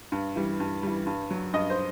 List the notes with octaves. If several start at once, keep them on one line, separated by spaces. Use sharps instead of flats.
G2
E3 G3
G2
E3 G3
G2
F#3
G2 D#5
C5